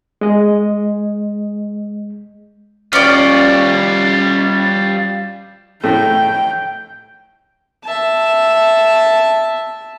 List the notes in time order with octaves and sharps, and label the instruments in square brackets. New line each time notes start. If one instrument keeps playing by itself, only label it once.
[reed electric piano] G#3 D#5
[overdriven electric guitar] G3 F4 [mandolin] C#4 D5
[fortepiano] A2 A3 [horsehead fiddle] G5
[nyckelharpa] E5 A5